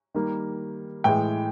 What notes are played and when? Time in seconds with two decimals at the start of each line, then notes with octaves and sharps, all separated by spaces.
0.14 D#3 G3 A#3
1.04 A2 E3 G#3 G5